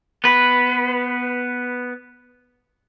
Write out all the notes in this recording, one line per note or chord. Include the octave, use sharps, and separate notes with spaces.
B3 B4